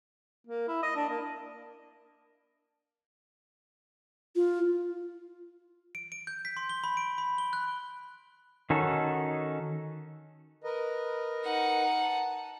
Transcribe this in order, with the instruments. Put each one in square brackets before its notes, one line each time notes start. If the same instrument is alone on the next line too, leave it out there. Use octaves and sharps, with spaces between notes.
[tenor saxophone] A#3
E4
D#5
D4
A#3
[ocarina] F4
[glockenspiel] D7
D7
G6
B6
C6
G7
B5
D7
B5
G7
F#6
[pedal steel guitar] D#3 C#4 D#4 F#4 A4
[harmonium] A#4 B4 D#5
[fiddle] D#4 F#5
[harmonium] A5